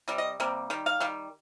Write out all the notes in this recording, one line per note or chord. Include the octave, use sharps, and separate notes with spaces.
C3 G3
D#5
C3 G3 A#3
D#3 G3
F5
D#3 G3